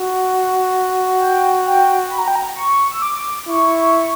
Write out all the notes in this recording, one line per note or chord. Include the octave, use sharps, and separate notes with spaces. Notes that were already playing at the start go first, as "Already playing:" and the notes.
Already playing: F#4
G5
G5
B5
A#5
G5
A#5
C#6
E6
D6
E4 C#6